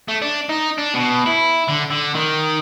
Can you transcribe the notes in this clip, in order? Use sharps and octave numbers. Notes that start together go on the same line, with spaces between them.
A3
D4
D#4
D4
B2
E4
D3
D3
D#3